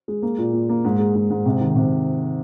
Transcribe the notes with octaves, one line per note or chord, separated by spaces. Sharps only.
G#3
A#3
A#2
A#2
A#3
G#2
G#3
G#2
G#2
C3
D#3
C3